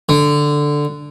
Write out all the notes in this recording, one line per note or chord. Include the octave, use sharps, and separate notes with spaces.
D3